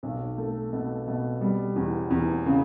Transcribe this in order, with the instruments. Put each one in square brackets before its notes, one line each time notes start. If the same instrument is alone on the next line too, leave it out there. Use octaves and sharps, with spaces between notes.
[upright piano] B1
A3
B2
B2
G3
E2
E2
C#3